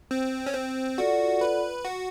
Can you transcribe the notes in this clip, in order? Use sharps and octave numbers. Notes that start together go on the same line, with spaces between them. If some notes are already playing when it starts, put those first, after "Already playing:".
C4
C#4
C4
F4 F#4 A4 D5 F#5
B4
F#4